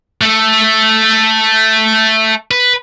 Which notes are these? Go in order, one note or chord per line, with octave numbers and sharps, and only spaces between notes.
A3 A4
B4